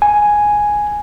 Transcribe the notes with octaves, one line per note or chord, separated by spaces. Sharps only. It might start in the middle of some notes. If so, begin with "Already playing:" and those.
G#5